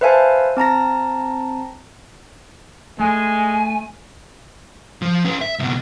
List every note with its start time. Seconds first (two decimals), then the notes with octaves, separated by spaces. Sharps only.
0.01 B4 C5 E5 F5 G#5 A5
0.57 C4 A5 A#5 A#6
3.00 G#3 A3 G#5
5.02 F3
5.25 C#4 B4
5.41 E5
5.59 C#2 B2